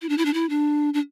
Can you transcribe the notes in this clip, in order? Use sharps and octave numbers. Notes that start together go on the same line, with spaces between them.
E4
D4
E4
D4
E4
D4
D4